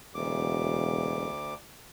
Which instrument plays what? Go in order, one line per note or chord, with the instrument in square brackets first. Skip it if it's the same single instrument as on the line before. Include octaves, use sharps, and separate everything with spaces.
[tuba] E1 [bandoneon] D2 D6